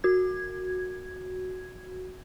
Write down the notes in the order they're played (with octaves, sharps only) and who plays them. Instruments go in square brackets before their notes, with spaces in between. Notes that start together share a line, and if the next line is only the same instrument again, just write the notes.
[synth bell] F#4 G#6